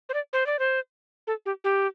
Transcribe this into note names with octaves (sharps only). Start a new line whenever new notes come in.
C5
D5
C5
D5
C5
A4
G4
G4